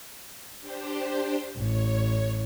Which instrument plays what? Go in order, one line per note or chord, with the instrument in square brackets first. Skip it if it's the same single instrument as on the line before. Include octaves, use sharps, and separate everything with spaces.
[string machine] D4 G4 C5
[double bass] A1 [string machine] C#5